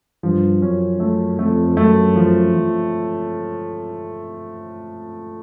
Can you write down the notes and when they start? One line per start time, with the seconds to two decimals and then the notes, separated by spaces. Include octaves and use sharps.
0.23 G2 F3
0.62 F#2 C#4
1.00 F#2 A3
1.39 F2 A3
1.77 F#2 A3
2.16 F3
2.54 F3